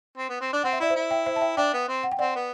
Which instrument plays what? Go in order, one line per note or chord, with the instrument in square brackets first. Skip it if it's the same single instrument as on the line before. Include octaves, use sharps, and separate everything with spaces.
[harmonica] C4
B3
C4
D4
[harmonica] C4 [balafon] F#5
[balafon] E5
[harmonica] E4 [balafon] D5
[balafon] C5 E5
[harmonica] E4
[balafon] E5 G5
C5 E5
A5
E5 G5
[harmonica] D4 [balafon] E5 G5
[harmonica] B3
C4
[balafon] F#5
G5
[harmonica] C4 [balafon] D5 F#5
[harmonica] B3